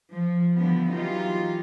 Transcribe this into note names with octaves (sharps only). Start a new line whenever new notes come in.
F3
D3 E3 F3 G3 B3
E3 F#3 D#4 F4 G4